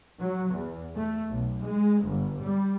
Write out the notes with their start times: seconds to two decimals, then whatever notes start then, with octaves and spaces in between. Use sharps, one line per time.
0.20 F#3
0.53 E2
0.95 A3
1.30 B1
1.61 G#3
2.02 G1
2.39 G3